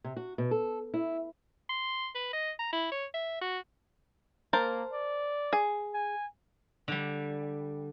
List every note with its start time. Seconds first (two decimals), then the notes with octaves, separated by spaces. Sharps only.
0.04 C3
0.17 F#4
0.38 B2
0.51 A4
0.94 E4
1.69 C6
2.15 B4
2.33 D#5
2.59 A#5
2.73 E4
2.92 C#5
3.14 E5
3.41 F#4
4.53 A#3 A#4 C5 A5
4.93 D5
5.53 G#4
5.94 G#5
6.88 D3 G3